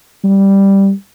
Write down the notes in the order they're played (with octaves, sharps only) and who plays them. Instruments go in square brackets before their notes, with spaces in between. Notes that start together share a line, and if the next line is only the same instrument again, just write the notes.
[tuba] G3